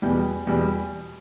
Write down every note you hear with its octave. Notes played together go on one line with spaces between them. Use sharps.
E2 B2 G3 G5
E2 B2 G3